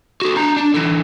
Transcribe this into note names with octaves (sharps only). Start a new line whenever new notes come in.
F#4 A4
D4 A#5
D4
D3 E3